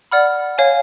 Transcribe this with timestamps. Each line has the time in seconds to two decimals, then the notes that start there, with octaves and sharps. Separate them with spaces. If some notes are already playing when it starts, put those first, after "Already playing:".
0.11 D5 F#5 B5 F6
0.58 C#5 F5 G#5